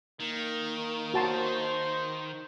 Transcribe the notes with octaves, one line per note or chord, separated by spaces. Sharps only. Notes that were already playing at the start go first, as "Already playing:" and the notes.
D#3 A#3
F#4 C5 A5 C6